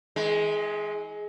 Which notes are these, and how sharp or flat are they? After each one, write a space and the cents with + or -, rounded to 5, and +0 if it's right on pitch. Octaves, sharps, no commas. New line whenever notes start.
E3 -35 G#3 +10